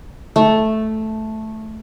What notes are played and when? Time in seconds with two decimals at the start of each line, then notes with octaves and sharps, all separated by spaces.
0.36 A3